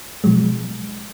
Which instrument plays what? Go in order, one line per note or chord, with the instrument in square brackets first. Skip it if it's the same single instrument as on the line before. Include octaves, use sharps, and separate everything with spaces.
[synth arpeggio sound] B2 F3 F#3 G#3